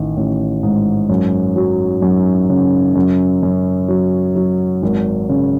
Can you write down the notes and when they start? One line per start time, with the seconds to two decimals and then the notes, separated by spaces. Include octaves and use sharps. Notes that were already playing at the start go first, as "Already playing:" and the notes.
Already playing: A1 D#3
0.17 A1
0.63 G#2
1.09 F#2
1.56 F#3
2.02 F#2
2.49 C#3
2.95 F#2
3.43 F#2
3.88 F#3
4.36 F#3
4.83 G#1
5.29 C#3